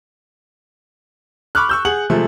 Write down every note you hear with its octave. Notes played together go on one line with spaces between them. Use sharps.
B5 C#6 D6 F6 F#6
C#6 E6 G6
G#4 F#5 F#7
C3 F3 G#3 A3